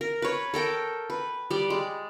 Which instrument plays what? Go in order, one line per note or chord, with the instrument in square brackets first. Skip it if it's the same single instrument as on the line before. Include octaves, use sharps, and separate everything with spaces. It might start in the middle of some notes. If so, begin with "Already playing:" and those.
[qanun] A#4
B4 C#5
A4 A#4 G5
B4
G3 D5
G#3